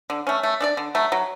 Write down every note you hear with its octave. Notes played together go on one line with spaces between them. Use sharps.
D3
A3 C#4
A3
D4 A4 D5
D3
F#3 A3
F#3